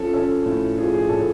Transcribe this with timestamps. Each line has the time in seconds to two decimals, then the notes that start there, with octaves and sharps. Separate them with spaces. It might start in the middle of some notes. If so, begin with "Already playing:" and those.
Already playing: F3 C#4 A4
0.14 C#4 A4
0.46 A2
0.78 F3 G#4
0.94 G#4
1.09 A2 A4